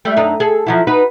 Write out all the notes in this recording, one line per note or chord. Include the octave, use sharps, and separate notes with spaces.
G3 A3
F#2 D4 D#4
G#4 A4
F3 F#3 E4
D#4 F#4 B4